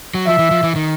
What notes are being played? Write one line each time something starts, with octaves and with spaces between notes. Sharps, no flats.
F#3
F3 E5
E3
F3
E3
D#3